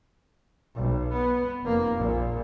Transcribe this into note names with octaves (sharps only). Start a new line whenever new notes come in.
B1
B3
F1 A#3
A#1 A#2